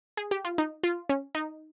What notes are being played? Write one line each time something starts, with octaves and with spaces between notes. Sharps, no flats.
G#4
G4
F4
D#4
F4
C#4
D#4